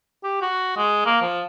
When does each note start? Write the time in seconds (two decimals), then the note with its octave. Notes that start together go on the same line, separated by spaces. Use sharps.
0.23 G4
0.41 F#4
0.76 G#3
1.05 A#3
1.21 F3